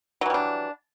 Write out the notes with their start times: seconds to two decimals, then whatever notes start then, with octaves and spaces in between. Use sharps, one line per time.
0.21 F#3
0.26 E3
0.30 G3
0.34 D4